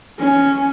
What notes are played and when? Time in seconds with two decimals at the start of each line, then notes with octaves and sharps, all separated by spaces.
0.20 C#4